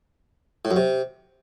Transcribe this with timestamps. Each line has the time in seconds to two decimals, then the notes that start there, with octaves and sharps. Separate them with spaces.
0.65 A2
0.71 F#2
0.76 C3